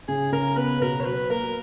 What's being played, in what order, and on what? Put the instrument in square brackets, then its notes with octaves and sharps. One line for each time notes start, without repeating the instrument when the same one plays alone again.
[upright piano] C#3 [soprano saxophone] G#4
[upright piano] C#3 [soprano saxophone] A#4
[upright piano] B3 [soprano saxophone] B4
[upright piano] B2 [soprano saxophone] A#4
[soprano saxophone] C#5
[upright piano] F#3 [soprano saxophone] B4
[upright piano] A#3 [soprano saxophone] A#4